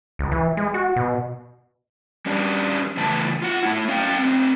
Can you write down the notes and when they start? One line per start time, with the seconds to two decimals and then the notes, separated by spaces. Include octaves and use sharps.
0.19 C#2
0.32 E3
0.57 G#3
0.74 F#4
0.96 B2
2.26 G3 C#4 D4 G4
2.97 C#3 E3 A3 A5
3.42 F4 F#5
3.63 A3 E4
3.88 C#4 F5 G5
4.19 A3 C4